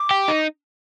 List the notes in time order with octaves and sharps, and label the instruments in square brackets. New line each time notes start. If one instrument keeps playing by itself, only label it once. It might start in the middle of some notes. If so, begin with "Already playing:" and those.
Already playing: [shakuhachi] D6
[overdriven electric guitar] G4
D#4